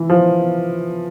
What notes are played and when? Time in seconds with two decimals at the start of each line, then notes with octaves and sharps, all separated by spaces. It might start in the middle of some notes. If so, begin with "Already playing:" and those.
Already playing: E3
0.09 F3